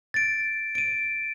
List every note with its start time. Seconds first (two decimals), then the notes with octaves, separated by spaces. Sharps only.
0.14 A6 D7
0.75 D7 D#7